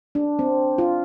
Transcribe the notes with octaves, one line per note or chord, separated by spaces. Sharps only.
D4
C4
F4